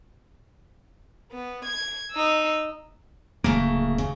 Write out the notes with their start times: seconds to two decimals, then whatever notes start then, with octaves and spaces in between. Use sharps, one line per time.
1.31 B3
1.65 G#6
2.12 D#4 E6
3.44 D1 C#3 A3 A#3
3.98 C#3